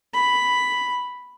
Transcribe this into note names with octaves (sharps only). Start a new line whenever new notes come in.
B5